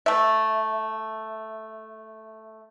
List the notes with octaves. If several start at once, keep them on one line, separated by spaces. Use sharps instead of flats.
A3 E5